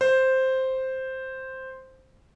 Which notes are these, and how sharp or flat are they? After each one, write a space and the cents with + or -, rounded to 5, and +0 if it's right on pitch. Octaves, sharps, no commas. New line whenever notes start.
C5 +0